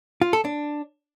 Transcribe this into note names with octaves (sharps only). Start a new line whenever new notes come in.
F4
A4
D4